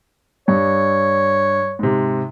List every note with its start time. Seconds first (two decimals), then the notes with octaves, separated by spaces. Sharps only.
0.48 G2 C#5
1.79 G#2 C3